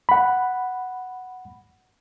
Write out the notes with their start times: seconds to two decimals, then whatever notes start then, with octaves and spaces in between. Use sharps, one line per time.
0.09 F#5 B5